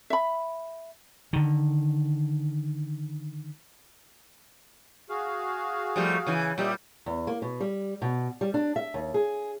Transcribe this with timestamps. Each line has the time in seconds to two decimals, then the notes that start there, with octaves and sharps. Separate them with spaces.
0.10 E5 B5
1.33 D3 D#3
5.09 F#4 G#4 F5
5.96 F3 G3 A3
6.27 C#3 E3
6.58 A#2 G3 D#4 G4 E5
7.06 E2
7.27 A#3
7.42 B2
7.60 G3
8.02 B2
8.41 G3
8.54 D4
8.76 E5
8.94 D#2
9.14 G#4